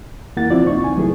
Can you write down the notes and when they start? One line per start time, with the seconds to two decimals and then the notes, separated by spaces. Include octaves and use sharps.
0.37 E2 A#3 E4 F#5 A6
0.50 F3 C4 E4 F4 D5
0.66 C#2 D#4 C#6
0.84 C2 G#5
0.97 F#3 A3 B3 E4 G#4